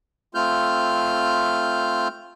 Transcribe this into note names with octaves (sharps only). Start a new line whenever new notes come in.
A3 C4 F4 F6 G6